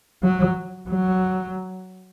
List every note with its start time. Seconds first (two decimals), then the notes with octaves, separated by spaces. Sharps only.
0.24 F#3
0.90 F#3